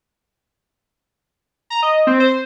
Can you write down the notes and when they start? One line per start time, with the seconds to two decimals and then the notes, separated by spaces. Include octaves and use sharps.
1.70 A#5
1.82 D#5
2.07 C4
2.20 C5